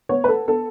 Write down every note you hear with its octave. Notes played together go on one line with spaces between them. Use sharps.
B3 C#5
B4
A4
B3 A4